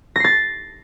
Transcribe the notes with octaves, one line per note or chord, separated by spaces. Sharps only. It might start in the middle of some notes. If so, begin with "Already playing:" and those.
A6 A#6 C7